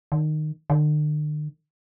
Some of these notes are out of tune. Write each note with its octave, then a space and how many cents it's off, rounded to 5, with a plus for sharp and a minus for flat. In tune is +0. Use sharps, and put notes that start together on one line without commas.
D#3 -20
D3 +45